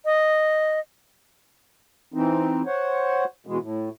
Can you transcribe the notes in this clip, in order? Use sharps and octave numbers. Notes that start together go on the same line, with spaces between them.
D#5
E3 C4 D#4
C5 C#5 F#5
B2 E3 G#3
A2